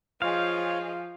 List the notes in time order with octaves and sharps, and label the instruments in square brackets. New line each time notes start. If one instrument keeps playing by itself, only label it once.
[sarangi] F3 [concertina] F4 C5 C#5 [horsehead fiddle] G#4 D#5 [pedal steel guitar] F5